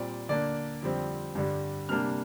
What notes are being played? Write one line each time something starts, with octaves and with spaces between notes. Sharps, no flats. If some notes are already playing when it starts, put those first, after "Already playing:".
Already playing: A#2 G3 C4 D5
D3 A#3 D4 D5
F2 D3 G3 C4
G2 D3 G3
C3 G3 A#3 D4 F6